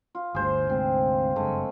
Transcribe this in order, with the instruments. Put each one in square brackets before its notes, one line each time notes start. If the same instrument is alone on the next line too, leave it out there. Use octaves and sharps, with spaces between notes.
[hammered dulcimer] F4
[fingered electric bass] G1 D2 [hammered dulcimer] G#4 C5
[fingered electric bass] D2 G#2 C3 [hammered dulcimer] C4
[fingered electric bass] F#1 G2 [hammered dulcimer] G#3 A3